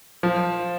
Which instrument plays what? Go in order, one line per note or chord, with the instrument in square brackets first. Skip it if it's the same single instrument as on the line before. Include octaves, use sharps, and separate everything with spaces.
[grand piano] F3